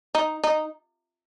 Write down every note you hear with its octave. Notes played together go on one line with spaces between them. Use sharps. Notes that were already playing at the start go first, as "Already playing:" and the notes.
D#4
D#4